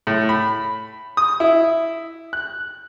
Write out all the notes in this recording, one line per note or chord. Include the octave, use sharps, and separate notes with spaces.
A2
B5
D#6
E4
F#6